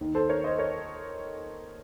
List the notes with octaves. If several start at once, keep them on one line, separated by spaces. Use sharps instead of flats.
D#2 D#3
A4 C5
A#4 C#5
C5 D#5
A#4 C#5